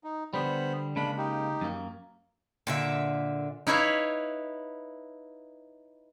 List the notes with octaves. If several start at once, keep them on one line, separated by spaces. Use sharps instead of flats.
D#4
D3 G3 B3 C5 B5
C#3 G#3 A#3 D4 B5
D#4 G4
F#2 A#3
A#2 D3 E5
D#4 E4 B4 C#5 E5 F5